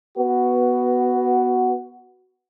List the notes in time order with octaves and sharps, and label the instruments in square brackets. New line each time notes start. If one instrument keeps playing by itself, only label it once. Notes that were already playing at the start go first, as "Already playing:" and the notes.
[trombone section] B3 F#4